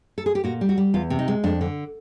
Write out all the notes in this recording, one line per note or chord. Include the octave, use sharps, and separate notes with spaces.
A4
G#4
G4
A#2 F#4
G3
F#4
G3
E2 F4
C3
D#4
G#3
F2 D4
D3